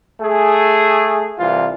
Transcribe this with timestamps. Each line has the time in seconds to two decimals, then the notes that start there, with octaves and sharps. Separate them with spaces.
0.21 A3 G#4
1.38 C2 E3 F4